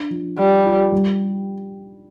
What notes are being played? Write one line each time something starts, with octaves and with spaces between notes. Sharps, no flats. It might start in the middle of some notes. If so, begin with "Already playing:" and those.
Already playing: D4
F3
F3 G3
F4
G3